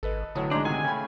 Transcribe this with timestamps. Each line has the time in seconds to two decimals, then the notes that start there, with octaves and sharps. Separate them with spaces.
0.03 G#1 A4 B4 D#5
0.35 A2 D3 F#3 C#5 A5 D#6
0.51 A1 G#3 D4 D#4 A#5 C6 G6
0.65 C3 D#3 G#5
0.85 C#3 A3 G5 B5